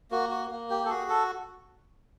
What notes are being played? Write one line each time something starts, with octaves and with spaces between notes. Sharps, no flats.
A#3 F#4
F#4
A#3
G4
A4
F#4 G#4
A4